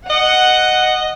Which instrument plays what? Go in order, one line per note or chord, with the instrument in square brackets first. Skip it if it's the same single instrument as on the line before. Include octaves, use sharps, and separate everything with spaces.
[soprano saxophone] D#5 [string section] F#5